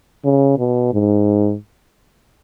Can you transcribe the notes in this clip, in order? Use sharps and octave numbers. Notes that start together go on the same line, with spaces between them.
C#3
B2
G#2